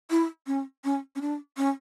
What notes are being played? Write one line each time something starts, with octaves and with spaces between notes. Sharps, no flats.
E4
C#4
C#4
C#4
D4
C#4